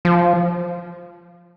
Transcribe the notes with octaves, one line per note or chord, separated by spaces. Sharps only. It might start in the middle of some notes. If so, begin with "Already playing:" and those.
F3